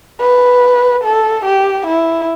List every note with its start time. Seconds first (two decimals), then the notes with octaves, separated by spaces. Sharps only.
0.21 B4
1.04 A4
1.45 G4
1.87 E4